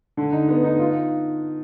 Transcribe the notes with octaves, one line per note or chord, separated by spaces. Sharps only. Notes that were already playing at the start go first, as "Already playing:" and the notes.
D3
D#4
B3
D#4
F4